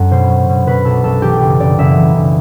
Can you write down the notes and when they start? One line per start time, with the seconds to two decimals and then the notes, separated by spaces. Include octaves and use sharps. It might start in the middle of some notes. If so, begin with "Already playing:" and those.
Already playing: F#2 F#3 A4
0.11 B2 C5
0.30 F#3
0.49 B2
0.67 B2 B4
0.85 B1 A4
1.04 B1 A4
1.22 E3 G4
1.41 F#1 G4
1.60 F#1 D5
1.78 F#1 E5
1.96 E3
2.15 F#1